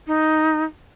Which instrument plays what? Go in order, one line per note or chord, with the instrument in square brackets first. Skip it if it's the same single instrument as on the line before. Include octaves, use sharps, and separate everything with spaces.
[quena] D#4